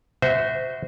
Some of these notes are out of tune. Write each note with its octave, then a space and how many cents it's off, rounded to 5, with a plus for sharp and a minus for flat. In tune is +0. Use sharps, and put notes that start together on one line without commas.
F#4 +0 C5 -25 E5 -20